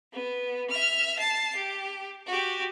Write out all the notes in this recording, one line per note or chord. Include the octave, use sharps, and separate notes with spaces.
B3
E5 F6
A5 C7
G4
F#4 G4